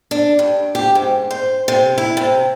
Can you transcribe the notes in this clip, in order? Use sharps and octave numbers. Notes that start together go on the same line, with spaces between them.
D4
G2
G4
G#2
C5
C3
E4
C3